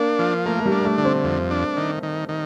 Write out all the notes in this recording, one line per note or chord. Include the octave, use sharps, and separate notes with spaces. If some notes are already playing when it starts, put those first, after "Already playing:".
Already playing: A#3 D4
F3
A3 A#3
A3
G3
D4
A3
D3
C4
F2
D4
D#3
D#3
D#3